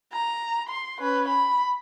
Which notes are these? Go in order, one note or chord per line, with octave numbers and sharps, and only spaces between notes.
A#5
C6
C#4 B4
B5